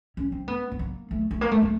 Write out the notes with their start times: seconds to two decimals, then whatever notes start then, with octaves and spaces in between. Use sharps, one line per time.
0.17 C#4
0.32 C4
0.48 B3
0.72 B3
0.79 A#3
1.11 A3
1.31 A3
1.41 A#3
1.51 A3
1.62 A3